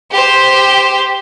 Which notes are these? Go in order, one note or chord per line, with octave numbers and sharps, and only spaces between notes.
G4 C5